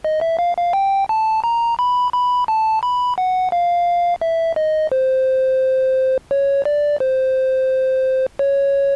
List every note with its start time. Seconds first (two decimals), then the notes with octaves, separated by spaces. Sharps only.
0.05 D#5
0.21 E5
0.39 F5
0.57 F5
0.73 G5
1.09 A5
1.44 A#5
1.79 B5
2.13 B5
2.48 A5
2.83 B5
3.18 F#5
3.52 F5
4.21 E5
4.56 D#5
4.92 C5
6.31 C#5
6.65 D5
7.00 C5
8.39 C#5